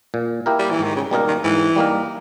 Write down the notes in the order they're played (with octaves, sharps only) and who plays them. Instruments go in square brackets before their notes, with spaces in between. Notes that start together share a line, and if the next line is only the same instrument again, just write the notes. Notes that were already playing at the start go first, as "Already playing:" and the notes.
[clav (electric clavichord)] A#2
A#3 E4 G4 A#4
[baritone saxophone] G3
E3
[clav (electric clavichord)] G#2 [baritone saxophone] D#3
[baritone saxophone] C#3
[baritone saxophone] B2 [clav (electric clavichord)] G3 A#3 D#4 A#4
[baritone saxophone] D#3
[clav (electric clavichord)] G#2 [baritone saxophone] E3
[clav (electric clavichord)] G3 A#3 D#4 A#4